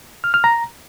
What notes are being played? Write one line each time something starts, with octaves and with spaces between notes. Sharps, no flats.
F6
F6
A#5